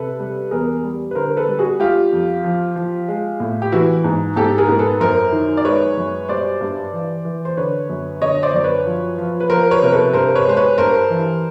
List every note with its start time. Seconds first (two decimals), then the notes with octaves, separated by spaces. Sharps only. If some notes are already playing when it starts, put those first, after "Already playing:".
Already playing: C3 A4 B4
0.20 G3
0.51 E2 G#4 A#4
0.84 G3
1.11 B4
1.15 D3 A#4 C5
1.37 A4 B4
1.48 G3
1.59 F#4 G#4
1.79 G3 F4 G4
2.12 F2
2.44 F3
2.76 F3
3.08 G#3
3.40 A2
3.62 G4
3.72 E3 E4 F#4
4.04 G#2
4.36 G#2 G4 A4
4.58 G#4 A#4
4.68 G#2
4.79 A4 B4
5.00 F#2 A#4 C5
5.32 D#3
5.57 D5
5.65 G#3 B4 C#5
5.97 F#2
6.29 G3 C5 D5
6.61 G2
6.93 E3
7.25 E3
7.45 C5
7.57 D3 B4 C#5
7.89 F#2
8.22 D3 C#5 D#5
8.43 C5 D5
8.54 F#2 D5
8.64 B4 C#5
8.86 F3
9.18 F3
9.40 B4
9.50 F3 A#4 C5
9.71 B4 C#5
9.82 C3 A#4
9.92 A4 B4
10.13 G2 A#4 C5
10.35 B4 C#5
10.45 G#3 C5
10.57 B4 C#5
10.78 G2 A#4 C5
11.10 E3